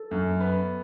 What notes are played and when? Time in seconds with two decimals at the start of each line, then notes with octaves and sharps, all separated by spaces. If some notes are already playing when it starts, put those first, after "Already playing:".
Already playing: A4
0.11 F#2
0.40 B3